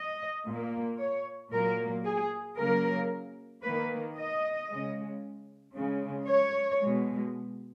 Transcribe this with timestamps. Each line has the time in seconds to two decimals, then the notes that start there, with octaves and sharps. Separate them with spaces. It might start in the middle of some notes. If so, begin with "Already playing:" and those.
Already playing: D#5
0.46 A#2 A#3
0.99 C#5
1.52 A#2 F#3 A#3 A#4
2.04 G#4
2.57 C#3 F#3 A#3 A#4
3.63 D#3 A#3 B4
4.16 D#5
4.68 C#3 G#3
5.74 C#3 G#3
6.27 C#5
6.80 B2 G#3